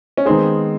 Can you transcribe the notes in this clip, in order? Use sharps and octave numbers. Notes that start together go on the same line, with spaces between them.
C#4
D#3 G#3 B3 C4 D#4 G#4